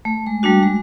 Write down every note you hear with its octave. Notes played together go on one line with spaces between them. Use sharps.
A3
G#3
G3 A3 D4 F#4
G#3